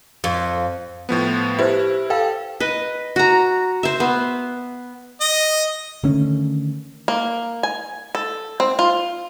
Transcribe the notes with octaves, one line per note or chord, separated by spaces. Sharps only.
F2
A2 F3 B3
E4 G4 B4 C5
A4 F5 G5
B4 D#5
F#4 A#5
C5 E5
B3
D#5
D3 D#3 A3 C#4
A#3
G#5
A4
C4
F4